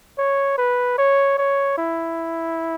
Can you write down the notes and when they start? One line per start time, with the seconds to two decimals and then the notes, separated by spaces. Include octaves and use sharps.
0.18 C#5
0.58 B4
0.98 C#5
1.38 C#5
1.78 E4